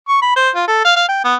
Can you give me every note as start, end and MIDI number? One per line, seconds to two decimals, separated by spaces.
0.08 0.18 85
0.22 0.36 83
0.36 0.49 72
0.55 0.66 65
0.68 0.81 69
0.85 0.92 77
0.96 1.04 77
1.08 1.23 79
1.24 1.35 59